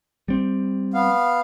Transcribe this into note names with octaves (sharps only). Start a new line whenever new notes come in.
G3 C4
B3 F5